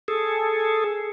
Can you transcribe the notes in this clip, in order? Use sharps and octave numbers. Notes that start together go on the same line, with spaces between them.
G#4 A4